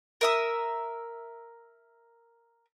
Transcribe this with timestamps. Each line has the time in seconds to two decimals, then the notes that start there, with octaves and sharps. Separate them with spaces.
0.21 A#4 E5 D#6